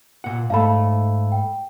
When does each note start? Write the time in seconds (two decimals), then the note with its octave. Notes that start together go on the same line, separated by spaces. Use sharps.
0.24 A#2 F#5
0.50 G#2 A3 F5 A5 B5
1.32 G5